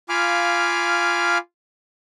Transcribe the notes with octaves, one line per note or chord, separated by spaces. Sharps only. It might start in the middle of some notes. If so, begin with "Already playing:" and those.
F4 F5 G#5 B5 D6 F6